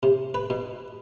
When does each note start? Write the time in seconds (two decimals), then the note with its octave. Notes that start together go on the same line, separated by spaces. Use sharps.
0.03 C3
0.34 B4
0.50 B2